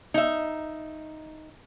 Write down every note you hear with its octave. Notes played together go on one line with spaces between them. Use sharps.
D#4 E5